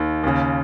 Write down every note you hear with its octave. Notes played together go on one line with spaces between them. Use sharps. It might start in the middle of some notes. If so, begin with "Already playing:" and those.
Already playing: D#2 D#3
D#2 C#3